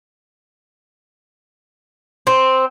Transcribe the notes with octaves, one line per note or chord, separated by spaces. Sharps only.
C4